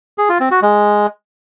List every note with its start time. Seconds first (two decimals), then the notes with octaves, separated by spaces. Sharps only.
0.18 G#4
0.29 F4
0.40 C4
0.51 F#4
0.62 G#3